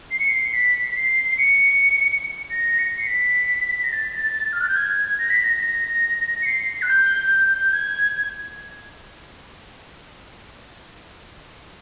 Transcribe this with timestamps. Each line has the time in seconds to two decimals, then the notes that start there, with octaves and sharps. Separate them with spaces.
0.11 C7
0.19 C#7
0.28 C7
0.53 B6
0.96 C7
1.38 C#7
2.51 A#6
2.79 C#7
3.00 C7
3.07 B6
3.84 A#6
3.92 A6
4.53 F6
4.61 F#6
4.68 G6
4.76 G#6
5.19 A#6
5.30 B6
5.42 A#6
5.61 A#6
6.42 C#7
6.46 C7
6.82 F#6
6.88 G6
7.30 G6
7.61 G6
7.73 G#6